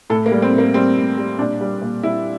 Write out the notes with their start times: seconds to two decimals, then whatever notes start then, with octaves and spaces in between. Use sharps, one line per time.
0.10 A2 A4
0.26 A#3
0.31 G3
0.42 C4
0.53 A2
0.58 A#3
0.74 G3 C4
0.96 A2
1.17 G3
1.39 A#2 D4
1.61 G3
1.81 A#2
2.03 G3 E4